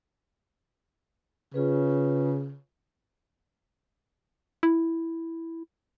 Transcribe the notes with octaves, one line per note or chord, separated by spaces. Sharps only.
C#3 F4 G#4 B4
E4